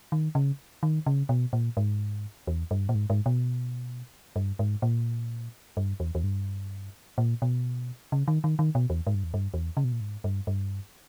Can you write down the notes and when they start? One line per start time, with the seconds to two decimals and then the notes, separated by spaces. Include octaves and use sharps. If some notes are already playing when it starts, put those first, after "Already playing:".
0.12 D#3
0.35 C#3
0.83 D#3
1.06 C#3
1.29 B2
1.53 A#2
1.77 G#2
2.47 E2
2.71 G2
2.89 A#2
2.95 G#2
3.10 G#2
3.26 B2
4.36 G2
4.59 G#2
4.82 A#2
5.77 G2
6.00 E2
6.15 E2
6.23 G2
7.18 A#2
7.42 B2
8.12 C#3
8.28 D#3
8.44 D#3
8.59 D#3
8.75 B2
8.90 E2
9.07 G#2
9.14 G2
9.24 E2
9.34 G2
9.54 E2
9.77 C#3
9.84 B2
9.92 A#2
10.00 G#2
10.24 G2
10.47 G2